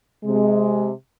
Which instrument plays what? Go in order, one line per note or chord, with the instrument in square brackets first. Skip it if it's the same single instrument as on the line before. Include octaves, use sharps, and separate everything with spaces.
[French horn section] C3 G#3